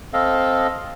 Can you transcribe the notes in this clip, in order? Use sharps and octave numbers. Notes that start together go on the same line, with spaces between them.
C4 A4 D#5 F5